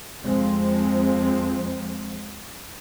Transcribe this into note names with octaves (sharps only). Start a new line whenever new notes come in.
F2 F3 G#3 C4